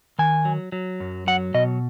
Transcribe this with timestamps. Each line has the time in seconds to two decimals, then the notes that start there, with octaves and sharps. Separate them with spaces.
0.19 D#3 G#5
0.45 F#3
0.72 F#3
1.00 F#2
1.27 F#3 F#5
1.54 B2 D#5